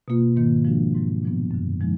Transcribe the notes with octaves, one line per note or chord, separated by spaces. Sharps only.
B2 A#3 F4
G#2 D#3 A#3
F3 G#3 D4 F#4
G#2 D#3 F#3
A#2 F3 B3
F#2 D3 F#3
D3 F3 G#3 D#4